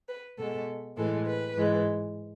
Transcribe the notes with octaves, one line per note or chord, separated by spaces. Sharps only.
B4
B2 G#3 A4
A2 E3 G#3 A4
B4
G#2 E3 G#3